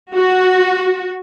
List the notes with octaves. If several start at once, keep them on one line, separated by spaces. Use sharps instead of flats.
F#4